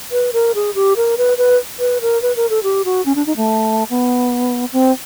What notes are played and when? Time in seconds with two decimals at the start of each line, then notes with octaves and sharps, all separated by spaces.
0.12 B4
0.33 A#4
0.55 G#4
0.75 G4
0.97 A#4
1.18 B4
1.38 B4
1.79 B4
2.01 A#4
2.22 B4
2.36 A#4
2.50 A4
2.63 G4
2.85 F#4
3.06 C#4
3.16 D4
3.26 D#4
3.37 A3
3.90 B3
4.73 C4